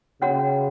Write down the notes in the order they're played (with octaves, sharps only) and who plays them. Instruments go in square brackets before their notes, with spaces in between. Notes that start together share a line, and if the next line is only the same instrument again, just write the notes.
[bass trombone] C#3 [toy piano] C#4 F#4 C#5 F#5 A#5